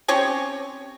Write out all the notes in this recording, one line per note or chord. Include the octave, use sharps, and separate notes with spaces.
C4 C#4 G4 C#5